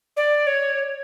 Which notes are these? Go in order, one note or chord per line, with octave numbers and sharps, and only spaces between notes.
D5
C#5